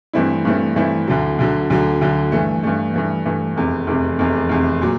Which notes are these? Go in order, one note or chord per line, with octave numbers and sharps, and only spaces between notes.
G2 E3 A3 C4 E4
G2 E3 A3 C4 E4
G2 E3 A3 C4 E4
D2 D3 F#3
D2 D3 F#3
D2 D3 F#3
D2 D3 F#3
G2 E3 A3
G2 E3 A3
G2 E3 A3
G2 E3 A3
F1 E2 C3
F1 E2 C3
F1 E2 C3
F1 E2 C3
A#2 F#3